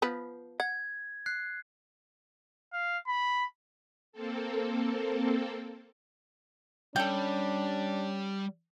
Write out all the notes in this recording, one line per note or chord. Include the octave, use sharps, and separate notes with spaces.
F3 B3 B4
F#5 G#6
F#6 C7
F5
B5
A#3 C4 A4
G3 C#4 D4 A4 G5